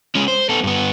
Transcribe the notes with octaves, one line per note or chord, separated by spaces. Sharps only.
G#3 C#4
C5
B3 A4
G2 B3